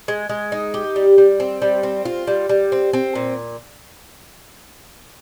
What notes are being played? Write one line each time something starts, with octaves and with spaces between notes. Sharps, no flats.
G#3
G#3
D#4
G4
G3
G3
C4
G3
C4
F4
G3
G3
C4
C4
A#2